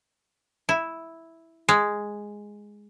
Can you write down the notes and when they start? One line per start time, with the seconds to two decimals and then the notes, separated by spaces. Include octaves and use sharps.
0.69 E4
1.69 G#3